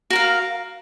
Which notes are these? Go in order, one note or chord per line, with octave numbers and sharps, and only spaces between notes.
F#4 A#4 F5